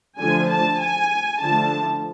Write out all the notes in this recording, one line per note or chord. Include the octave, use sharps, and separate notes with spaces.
D3 F3 A3 G#5
A5
G#5
D3 F3 A3 A5